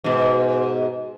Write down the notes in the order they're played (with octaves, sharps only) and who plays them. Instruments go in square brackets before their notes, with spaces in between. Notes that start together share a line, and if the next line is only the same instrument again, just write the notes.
[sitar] G#2 B2